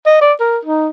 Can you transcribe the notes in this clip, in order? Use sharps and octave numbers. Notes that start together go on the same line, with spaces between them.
D#5
D5
A#4
D#4